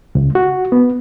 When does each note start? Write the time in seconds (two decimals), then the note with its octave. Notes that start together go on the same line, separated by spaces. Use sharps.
0.15 C#2
0.35 F#4
0.72 B3